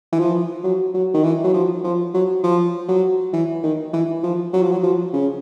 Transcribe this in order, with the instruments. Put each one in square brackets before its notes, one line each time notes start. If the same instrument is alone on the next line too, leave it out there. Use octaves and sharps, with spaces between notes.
[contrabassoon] E3
F3
F#3
F#3
D#3
E3
F#3
F3
F3
F#3
F3
F#3
E3
D#3
E3
F3
F#3
F3
F#3
F3
C#3